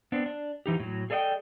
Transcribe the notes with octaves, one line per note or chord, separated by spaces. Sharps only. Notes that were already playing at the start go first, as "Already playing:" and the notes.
B3 C4 D4
D4
E3 D#4 G4
A2 F#3
G#4 A4 D5 D#5 F5 G5